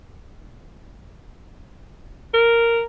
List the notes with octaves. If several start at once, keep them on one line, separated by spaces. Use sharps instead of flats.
A#4